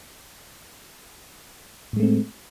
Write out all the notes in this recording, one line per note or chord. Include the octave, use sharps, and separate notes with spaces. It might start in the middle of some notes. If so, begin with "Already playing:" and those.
A2 G#3 A3 C4